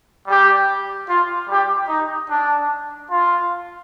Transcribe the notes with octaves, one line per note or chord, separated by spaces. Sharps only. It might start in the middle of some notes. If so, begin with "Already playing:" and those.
G3 G4
F4
G3 G4
D#4
D4
F4